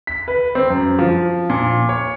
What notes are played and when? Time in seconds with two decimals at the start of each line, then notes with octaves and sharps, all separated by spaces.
0.07 B6
0.28 B4
0.55 C4
0.70 F#2
0.99 F3
1.50 A#2
1.89 C#5